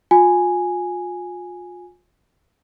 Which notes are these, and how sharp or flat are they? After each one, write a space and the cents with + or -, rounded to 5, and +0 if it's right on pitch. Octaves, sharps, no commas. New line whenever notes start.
F4 +35 G#5 +0